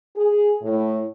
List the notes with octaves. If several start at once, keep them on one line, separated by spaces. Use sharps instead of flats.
G#4
A2